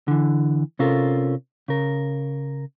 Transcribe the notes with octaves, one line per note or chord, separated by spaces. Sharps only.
D3 E3
C3 C#4 F4 A4 A#4
C#3 A#4